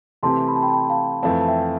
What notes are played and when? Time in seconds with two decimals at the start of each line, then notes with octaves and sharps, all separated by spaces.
0.23 C3 E3 A3 C4 G4 A5 C6
0.48 B5
0.56 A5
0.62 G5 B5
0.68 A5
0.73 G5 B5
0.90 F5 A5
1.23 F2 E3 A3 C4 F5 A5
1.41 A5
1.48 E5 G5